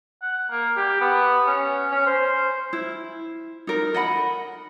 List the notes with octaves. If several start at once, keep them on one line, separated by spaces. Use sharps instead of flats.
F#5
A#3
G4
B3
C#4
C#4
C5
E4
D#4 A#4
D#5 F#5 B5